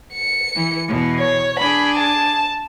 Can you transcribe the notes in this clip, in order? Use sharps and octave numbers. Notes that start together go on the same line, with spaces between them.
C#7
E3
E2 B2
C#5
D4 G#4 B5
A5